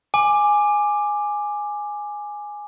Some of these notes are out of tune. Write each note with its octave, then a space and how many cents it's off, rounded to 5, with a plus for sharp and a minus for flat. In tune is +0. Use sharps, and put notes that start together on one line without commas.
G#5 +0 D6 +10